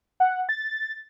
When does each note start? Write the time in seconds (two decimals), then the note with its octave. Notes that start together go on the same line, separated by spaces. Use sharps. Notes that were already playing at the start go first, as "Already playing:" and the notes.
0.20 F#5
0.49 A6